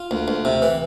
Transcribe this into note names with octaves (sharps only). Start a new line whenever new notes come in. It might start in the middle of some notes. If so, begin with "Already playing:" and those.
Already playing: F4
D2
D2
C3
E3